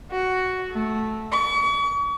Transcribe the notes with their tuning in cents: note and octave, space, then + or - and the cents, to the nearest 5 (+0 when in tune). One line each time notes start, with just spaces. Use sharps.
F#4 +5
A3 -10
C#6 +40